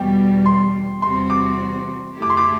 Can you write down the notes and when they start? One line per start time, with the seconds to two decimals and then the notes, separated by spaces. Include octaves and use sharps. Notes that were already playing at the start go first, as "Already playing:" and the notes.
Already playing: E2 B2 G3 G5
0.46 C6
1.02 E2 C3 G3 C4 F#4 C6
1.30 D6
2.15 F#2 D3 A3 E4 G4
2.22 D6
2.30 C6
2.37 D6